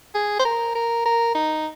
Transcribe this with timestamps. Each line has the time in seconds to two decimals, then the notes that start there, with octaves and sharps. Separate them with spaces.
0.15 G#4
0.39 C5
0.45 A#4
0.75 A#4
1.05 A#4
1.35 D#4